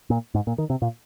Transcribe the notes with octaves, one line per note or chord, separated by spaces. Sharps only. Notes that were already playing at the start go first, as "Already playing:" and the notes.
A#2
G#2
A#2
D#3
C3
A#2